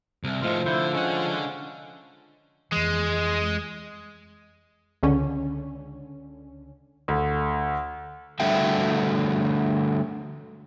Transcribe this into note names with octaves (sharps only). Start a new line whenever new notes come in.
C2
A2 D#3 F3 G#3 C6 F6
D3 E4 C5
D3 G#3 C#4 F#5
F2 E3 G#3
C#2 D3 C#4
D2
D3 G3 A3 F#4 E5 G5